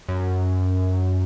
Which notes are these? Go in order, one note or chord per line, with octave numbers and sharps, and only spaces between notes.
F#2